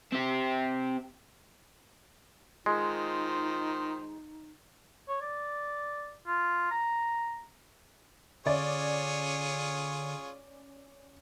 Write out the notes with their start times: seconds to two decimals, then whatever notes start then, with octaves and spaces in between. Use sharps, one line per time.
0.13 C4 G4
2.66 D#3 G#3 D#4 F4 C5
5.08 C#5
5.22 D5
6.27 F4
6.71 A#5
8.46 D3 C#4 F4 G#4 C#5 D5